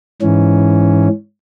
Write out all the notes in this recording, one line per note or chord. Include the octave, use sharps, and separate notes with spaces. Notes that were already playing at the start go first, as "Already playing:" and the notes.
G#2 E3 C#4